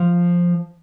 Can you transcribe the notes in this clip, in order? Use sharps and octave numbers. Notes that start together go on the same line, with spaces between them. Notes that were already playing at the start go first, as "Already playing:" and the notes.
Already playing: F3